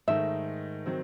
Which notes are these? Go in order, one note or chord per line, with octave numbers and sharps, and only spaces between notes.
G#2 D#3 A3 D#4 E5
D#3 F#3 C4